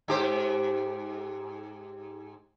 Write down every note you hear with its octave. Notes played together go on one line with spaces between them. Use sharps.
G#2 G4 C5